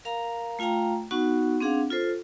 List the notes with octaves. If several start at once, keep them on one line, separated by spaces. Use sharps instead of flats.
A#4 F5 A#5
A3 F4 F5 G5 A#5
B3 D#4 F#4 F#5 C#6
C4 D4 G#4 F5 F#5
F4 A4 C5